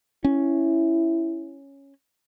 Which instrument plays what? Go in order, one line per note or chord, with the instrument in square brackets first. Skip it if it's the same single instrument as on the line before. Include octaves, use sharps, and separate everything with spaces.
[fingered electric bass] C#4 [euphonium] E4